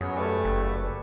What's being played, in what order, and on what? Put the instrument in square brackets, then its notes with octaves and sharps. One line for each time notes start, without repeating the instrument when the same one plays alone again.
[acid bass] F#2 [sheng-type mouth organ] B3 F#4 C#5 [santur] G#4
[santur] G3 B4 G#5 [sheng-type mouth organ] A3 A5 C#6
[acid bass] F#1